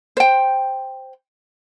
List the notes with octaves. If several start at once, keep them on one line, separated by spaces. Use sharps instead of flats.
C5 G5